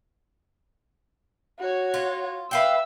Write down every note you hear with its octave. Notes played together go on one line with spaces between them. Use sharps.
F#4 C#5
F4
B4 E5 F5 G5 E6